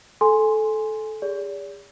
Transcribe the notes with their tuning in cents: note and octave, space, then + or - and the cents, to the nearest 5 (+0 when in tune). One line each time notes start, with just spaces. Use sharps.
A4 -15 G#5 +0 C6 +0
G#4 -40 D5 -45